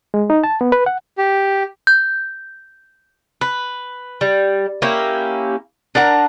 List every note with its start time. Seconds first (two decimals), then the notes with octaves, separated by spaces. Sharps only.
0.14 G#3
0.30 D#4
0.44 A5
0.61 B3
0.72 B4
0.86 F#5
1.18 G4
1.87 G6
3.41 B4
4.21 G3
4.82 A#3 C#4 E4 G4
5.95 D4 A#4 F#5 A#5